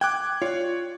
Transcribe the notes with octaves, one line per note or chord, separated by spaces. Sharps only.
G5 D6 F#6 G#6
F4 C#5 D5